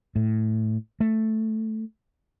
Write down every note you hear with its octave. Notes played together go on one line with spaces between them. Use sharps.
A2
A3